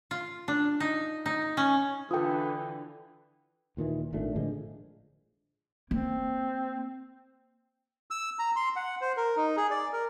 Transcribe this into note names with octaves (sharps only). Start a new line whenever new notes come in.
F4
D4
D#4
D#4
C#4
D3 E3 F4 A4 B4 G5 D#6
D#2 A#2 D#3 E3
G#1 A#2 A3 D4
A2 D3 F3 G#3
A#3 C4
E6
A#5
C6
F#5
C5
A#4
D#4
G#4
D5
A#4